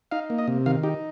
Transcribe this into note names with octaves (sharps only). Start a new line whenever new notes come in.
D#4 F5
A#3
D#5
C3
D#3 F5
D#4 G4